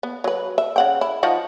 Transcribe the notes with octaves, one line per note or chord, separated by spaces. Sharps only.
B3
F#3 B4
E5
C#3 F#5 G5
E4
F3 D#4 F#4